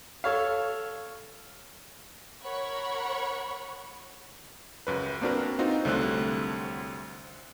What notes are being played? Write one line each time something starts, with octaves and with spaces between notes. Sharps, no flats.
A4 C#5 F5
A#4 C#5 F#5 B5 C#6
C#2 F#2 B4
A#3 C4 D4 F#4 A#4 B4
C4 D#4 F4 F#4
C2 D3 F#3 A3 C4 F#6